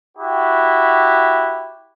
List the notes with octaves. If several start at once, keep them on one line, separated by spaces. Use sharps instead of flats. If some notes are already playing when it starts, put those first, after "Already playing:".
E4 F#4 G4